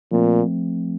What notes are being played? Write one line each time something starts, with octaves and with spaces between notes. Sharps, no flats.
A#2 F3 A3 C4